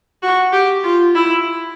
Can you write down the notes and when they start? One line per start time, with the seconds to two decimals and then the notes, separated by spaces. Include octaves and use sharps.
0.23 F#4
0.53 G4
0.84 F4
1.15 E4